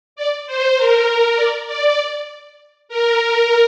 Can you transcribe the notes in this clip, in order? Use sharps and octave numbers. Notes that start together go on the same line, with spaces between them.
D5
C5
A#4
D5
D5
A#4